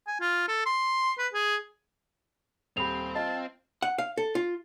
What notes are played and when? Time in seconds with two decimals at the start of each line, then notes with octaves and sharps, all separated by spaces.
0.07 G#5
0.21 F4
0.48 A4
0.66 C6
1.19 B4
1.33 G#4
2.77 D#1 C4 G4 B5 F7
3.15 F4 D#5 A5
3.82 F#5
3.98 F5
4.17 A4
4.35 F4